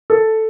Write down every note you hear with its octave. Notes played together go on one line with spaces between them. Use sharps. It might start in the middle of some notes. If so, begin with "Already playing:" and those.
A4